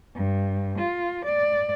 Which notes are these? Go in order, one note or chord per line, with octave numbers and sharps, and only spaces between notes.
G2
F4
D5